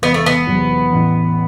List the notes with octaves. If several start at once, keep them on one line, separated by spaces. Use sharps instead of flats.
E1 B3
A3
B3
E2 C3 F#3
A1